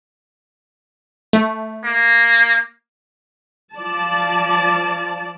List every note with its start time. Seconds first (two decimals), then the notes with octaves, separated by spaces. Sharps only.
1.33 A3
1.85 A#3
3.76 F3 D5 A5